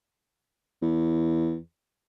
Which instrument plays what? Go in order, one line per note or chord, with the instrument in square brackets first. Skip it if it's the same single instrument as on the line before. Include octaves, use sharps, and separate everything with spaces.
[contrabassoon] E2